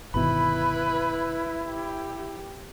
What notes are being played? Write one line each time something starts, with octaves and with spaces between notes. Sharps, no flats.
G1 B2 D#3 E4 B4 B5
G4